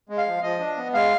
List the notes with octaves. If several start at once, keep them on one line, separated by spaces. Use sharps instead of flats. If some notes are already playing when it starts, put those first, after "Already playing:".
G#3
F5
F3
F3 D#5
D4
B3
G#3 F5